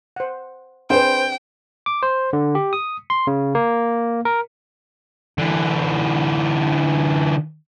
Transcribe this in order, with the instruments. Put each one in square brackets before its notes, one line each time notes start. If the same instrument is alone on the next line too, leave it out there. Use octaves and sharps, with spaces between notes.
[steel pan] C5 F#5
[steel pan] C4 D4 G#4 [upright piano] B4 C5 [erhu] G5
[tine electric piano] D6
C5
D3
G4
D#6
C6
C#3
A#3
A#4
[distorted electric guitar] D3 E3